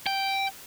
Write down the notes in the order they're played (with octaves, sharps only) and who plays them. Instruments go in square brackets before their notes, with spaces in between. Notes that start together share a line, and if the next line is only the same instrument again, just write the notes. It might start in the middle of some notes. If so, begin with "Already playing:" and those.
[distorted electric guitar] G5